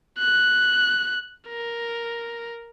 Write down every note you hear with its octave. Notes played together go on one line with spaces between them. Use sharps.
F#6
A#4